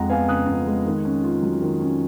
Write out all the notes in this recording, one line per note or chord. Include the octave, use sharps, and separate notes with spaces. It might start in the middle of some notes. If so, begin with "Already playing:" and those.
Already playing: F2 G#3 F#5 A#5
B3 F5 G#5
C#3 D#6 F#6
F2
G#3
D#3
C#4
F4
F#3
D#3
C#4